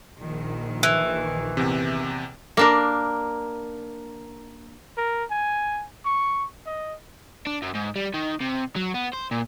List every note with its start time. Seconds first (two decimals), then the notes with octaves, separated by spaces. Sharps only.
0.18 A#1 D#3
0.83 E3
1.57 E2 C3
2.57 A#3 D4 A#4
4.97 A#4
5.31 G#5
6.05 C#6
6.66 D#5
7.47 D4
7.62 F#2
7.75 G#2
7.96 G3
8.14 D#3
8.40 C3
8.76 F#3
8.94 B3
9.13 C5
9.31 A#2